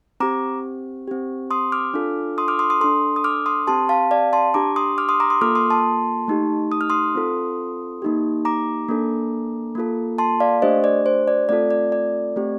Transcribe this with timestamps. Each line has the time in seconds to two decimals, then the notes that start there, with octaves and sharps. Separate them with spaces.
0.20 C4 G4 A#5 D6
1.08 C4 G4
1.51 C6 D#6
1.72 D6 F6
1.94 D4 F4 A4
2.38 C6 D#6
2.48 D6 F6
2.59 C6 D#6
2.70 C6 D#6
2.81 D4 A4 C6 D#6
3.16 D#6
3.24 D6 F6
3.46 C6 D#6
3.67 C4 G4 A5 C6
3.89 F5 A5
4.11 D5 F5
4.33 A5 C6
4.54 D4 G4 A#5 D6
4.76 C6 D#6
4.98 D6 F6
5.09 C6 D#6
5.20 A#5 D6
5.30 C6 D#6
5.41 A#3 F4 A4 D6 F6
5.55 C6 D#6
5.70 A5 C6
6.28 A3 D#4 G4
6.72 D#6
6.81 F6
6.90 C6 D#6
7.15 C4 F4 A4
8.02 A#3 D#4 G4
8.45 A#5 D6
8.89 A#3 D4 A4
9.75 A#3 F4 A4
10.18 A5 C6
10.40 D5 F5
10.62 A3 D4 G4 C5 D#5
10.84 D5
11.06 C5
11.28 D5
11.49 A3 C4 F4 A4 D5
11.71 D5
11.92 D5
12.36 A3 C4 G4